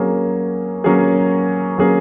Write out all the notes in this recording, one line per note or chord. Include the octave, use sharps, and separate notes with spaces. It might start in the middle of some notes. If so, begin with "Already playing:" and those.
Already playing: F#3 A#3 C#4 G#4
F#3 A#3 C#4 G#4
F#3 A#3 C#4 G#4